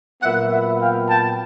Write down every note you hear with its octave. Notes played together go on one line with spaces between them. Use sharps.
A#2 F#3 B3 E5 F#5
E5 F#5
F5 G5
G5 A5